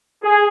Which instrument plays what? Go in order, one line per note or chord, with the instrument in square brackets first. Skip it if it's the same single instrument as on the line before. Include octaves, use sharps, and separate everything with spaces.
[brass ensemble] G#4